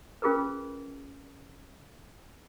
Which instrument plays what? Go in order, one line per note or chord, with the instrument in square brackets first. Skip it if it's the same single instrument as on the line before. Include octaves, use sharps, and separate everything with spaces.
[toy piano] C#4 F4 G#4 A#4 B4